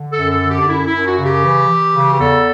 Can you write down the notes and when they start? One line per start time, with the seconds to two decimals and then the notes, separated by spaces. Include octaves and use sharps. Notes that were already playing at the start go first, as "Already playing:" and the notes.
Already playing: D3
0.11 A4
0.17 F#2
0.30 A4
0.43 D3
0.49 G4
0.60 D4
0.68 F#2 E4
0.87 E4
0.94 F#2
1.06 F#4
1.19 C#3
1.24 G4
1.44 E3
1.68 E3
1.95 C#3
2.13 G4
2.20 E2 A4